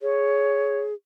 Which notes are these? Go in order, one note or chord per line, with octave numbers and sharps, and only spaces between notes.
G#4 C#5